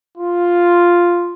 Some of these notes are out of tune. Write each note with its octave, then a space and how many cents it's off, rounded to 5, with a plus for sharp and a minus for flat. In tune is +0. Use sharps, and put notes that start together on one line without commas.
F4 +0